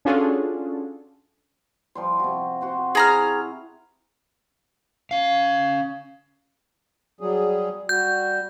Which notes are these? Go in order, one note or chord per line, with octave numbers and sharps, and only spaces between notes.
C#4 D4 F4 F#4 G#4 A4
F3 G3 C6
C3 F#4
F#4 C5 F#5
E4 G#4 A#5 F6
C#4 F5
F#3 G3 G#4
G3 F#4 G6